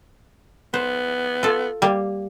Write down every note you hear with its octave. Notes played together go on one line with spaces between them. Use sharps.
B3 C5
F4 A4
G3 A#3